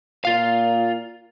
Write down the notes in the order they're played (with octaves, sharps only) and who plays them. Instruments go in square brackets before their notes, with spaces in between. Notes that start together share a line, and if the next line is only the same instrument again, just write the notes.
[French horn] A#2 [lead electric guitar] F4 F5